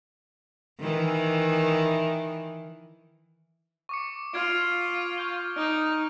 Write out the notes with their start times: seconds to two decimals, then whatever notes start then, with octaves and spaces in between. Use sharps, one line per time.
0.80 D#3 E3
3.89 C#6 D6 C#7
4.34 F4 F6 G#6 D7
5.18 C#6 G6 G7
5.57 D#4 D7